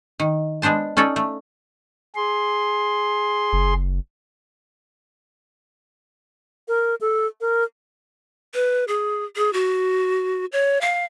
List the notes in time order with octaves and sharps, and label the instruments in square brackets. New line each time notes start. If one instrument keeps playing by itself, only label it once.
[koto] D#3
G#3 B3 D4 C5 A5
C#4 D#4 A4 D5
A3
[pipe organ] G#4 C6
[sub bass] F#1
[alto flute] A#4
A4
A#4
[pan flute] B4
G#4
G#4
F#4
C#5
F5